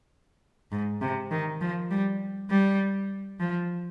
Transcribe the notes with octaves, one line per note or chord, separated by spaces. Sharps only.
G#2
C3
D#3
F3
G3
G3
F3